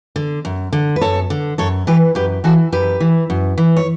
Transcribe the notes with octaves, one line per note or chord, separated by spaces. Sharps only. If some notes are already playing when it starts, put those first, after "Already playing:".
D3
F#2
D3
B4
F#2 A4 C#5
D3
F#2 A4 C#5
E3 G4 B4
F#2 G4 B4
E3 F#4 A4
F#2 G4 B4
E3
F#2
E3
C#5